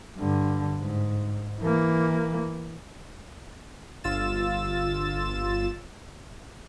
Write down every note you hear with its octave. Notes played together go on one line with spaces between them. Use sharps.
G2 D3
G#2
E3 A#3
G1 F4 E6 A6 E7